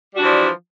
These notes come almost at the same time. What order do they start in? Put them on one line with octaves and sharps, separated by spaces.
G3 F#4 D4 E3 F3